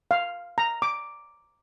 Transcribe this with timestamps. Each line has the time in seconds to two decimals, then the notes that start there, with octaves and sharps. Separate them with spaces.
0.11 F5
0.58 A#5
0.82 D6